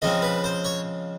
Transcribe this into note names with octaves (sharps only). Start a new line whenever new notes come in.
C#3 F3 G#3 C4 D#5
B4
C5
C#5